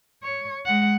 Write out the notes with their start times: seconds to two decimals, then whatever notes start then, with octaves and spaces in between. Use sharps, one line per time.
0.23 C#5
0.66 G#3 F#5